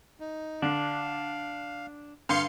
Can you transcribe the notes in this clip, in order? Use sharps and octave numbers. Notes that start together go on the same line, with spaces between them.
D#4
D3 D4 F5
G2 D3 F5 C6 C#7